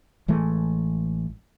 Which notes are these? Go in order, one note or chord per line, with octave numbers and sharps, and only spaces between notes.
A1 E3 G#3 A3